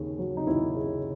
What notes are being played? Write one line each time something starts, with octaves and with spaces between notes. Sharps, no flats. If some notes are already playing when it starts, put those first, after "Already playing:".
Already playing: D#2 C#3
F#3
D#4
D#2 E4
C#3